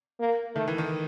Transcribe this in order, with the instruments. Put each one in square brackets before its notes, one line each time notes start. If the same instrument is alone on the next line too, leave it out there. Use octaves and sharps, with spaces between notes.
[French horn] A#3
[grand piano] D#3 [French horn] A3
[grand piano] E3
D#3